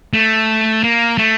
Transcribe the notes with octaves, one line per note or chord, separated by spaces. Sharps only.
A3
A#3
A3